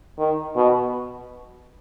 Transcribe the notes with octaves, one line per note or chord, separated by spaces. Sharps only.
D#3
B2